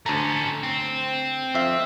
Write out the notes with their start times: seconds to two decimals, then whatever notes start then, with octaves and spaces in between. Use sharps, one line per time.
0.06 D2 A3 C#4 A5 A#5
0.63 C4
1.55 F2 E5 F5